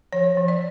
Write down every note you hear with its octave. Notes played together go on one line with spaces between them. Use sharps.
F3 C#5
F3
D5